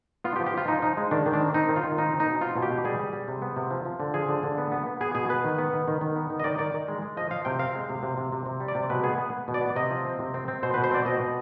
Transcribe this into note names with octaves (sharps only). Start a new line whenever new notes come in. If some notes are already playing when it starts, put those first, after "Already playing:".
B3 F4
G4
F3
G4
F3 F4
F3 D#4
F3 D#4
G#3
D#3 D4
D#3
D4
C4
C4 D#4
D#3
F4
D#3
C4 D#4
C4
D#4
B2
C4 F4
B2
G4
B2
G3 G#4
G3
G3
C3
B3
C3
F3
F3
D3
F3 G#4
D3
D3
B3
B3
B3
B3 G#4
B2 G#4
B3 B4
D#3
B3
D#3
D#3
D#3
B3
D#3
D#5
D#3 D5
D#3 D5
D#3
G#3
G#3
F3 D#5
F3 F5
C3 G5
C4 F5
G#3
C3
C3
C3
C3
C3
G3
D5
C3
B2 B4
B3 G#4
B3
B3
B2
D5
B3
C3 D#5
F3
C4
C3
C4
C4
B2 C5
B4
B2
C5
C4 D5
B2 D#5
B2